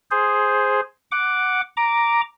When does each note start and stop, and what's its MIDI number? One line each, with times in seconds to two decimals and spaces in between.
0.11 0.81 68
0.11 0.81 72
1.12 1.61 78
1.12 1.61 86
1.77 2.21 82
1.77 2.21 86